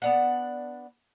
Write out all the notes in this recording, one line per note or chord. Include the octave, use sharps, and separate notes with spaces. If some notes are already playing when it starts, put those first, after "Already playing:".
B3 D4 F#5